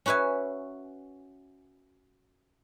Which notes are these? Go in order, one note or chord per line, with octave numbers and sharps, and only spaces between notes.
C#4 F#4 B4 E5 G#5